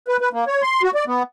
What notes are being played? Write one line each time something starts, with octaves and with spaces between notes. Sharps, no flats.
B4
B4
A#3
C#5
C6
F#4
D5
B3